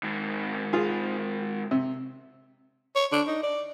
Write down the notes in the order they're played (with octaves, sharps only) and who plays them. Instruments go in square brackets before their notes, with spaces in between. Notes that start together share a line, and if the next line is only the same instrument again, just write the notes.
[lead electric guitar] G#2 D#3
[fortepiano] F4 G#4
C3
[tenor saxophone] C#5
D4
D#4
D5